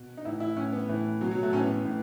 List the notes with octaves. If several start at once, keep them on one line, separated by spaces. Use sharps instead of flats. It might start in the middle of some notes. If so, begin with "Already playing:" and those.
Already playing: B2
D#4
A2 E3 E4
E4
A2 E3 C#4
B3
A2 E3
B2 F#3
F#3
A3
A2 E3 C#4
B3
A2 E3